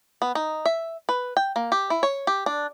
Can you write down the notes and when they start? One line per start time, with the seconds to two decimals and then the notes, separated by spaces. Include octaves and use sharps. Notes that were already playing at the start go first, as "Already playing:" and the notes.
0.22 B3
0.35 D#4
0.66 E5
1.09 B4
1.37 G5
1.56 A#3
1.72 G4
1.90 E4
2.03 C#5
2.27 G4
2.46 D4